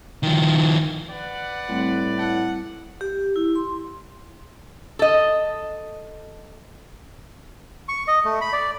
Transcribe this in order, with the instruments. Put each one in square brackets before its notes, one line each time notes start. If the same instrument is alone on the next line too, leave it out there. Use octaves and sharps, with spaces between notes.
[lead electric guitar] D#3 F3
[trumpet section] B4 D5 [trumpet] F#5
[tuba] A2 [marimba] G3 A3 C4
[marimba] E4 A5 [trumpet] F#5
[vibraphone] G4
E4
C6
[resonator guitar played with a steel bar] A4 D#5
[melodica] C#6
D#5
A3
B5
D5